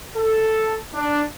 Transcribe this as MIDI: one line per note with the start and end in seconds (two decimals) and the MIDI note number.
0.16 0.75 69
0.94 1.21 62